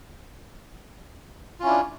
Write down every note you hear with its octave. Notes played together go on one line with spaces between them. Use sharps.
C#4 D4 E4 F4